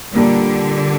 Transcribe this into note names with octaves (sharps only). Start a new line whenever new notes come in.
A#2 D3 G3 A#3